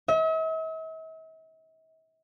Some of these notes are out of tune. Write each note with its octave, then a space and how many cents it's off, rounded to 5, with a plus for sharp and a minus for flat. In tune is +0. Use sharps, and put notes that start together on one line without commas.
E5 -45